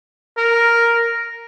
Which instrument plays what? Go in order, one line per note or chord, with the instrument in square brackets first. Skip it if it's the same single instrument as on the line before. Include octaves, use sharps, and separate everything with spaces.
[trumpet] A#4